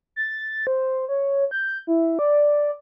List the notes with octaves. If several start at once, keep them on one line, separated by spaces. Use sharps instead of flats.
A6
C5
C#5
G6
E4
D5